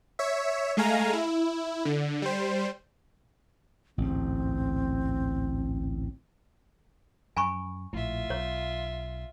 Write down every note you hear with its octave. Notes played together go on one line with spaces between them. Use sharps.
C#5 E5
G#3 A3 F5 G#5 A#5
E4
D3
G3 C5
A1 D2 G#2 C4
F#2 G#5 B5 C#6
A#1 A2 F4 E5
B1 C#5